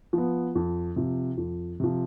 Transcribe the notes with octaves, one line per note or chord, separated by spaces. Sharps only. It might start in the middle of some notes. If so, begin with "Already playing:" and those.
F3 B3
F2
C3 F3
F2
C3 F3